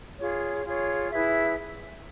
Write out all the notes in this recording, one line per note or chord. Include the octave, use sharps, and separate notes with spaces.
F4 G#4 C#5
F4 G#4 C#5
E4 G#4 B4 E5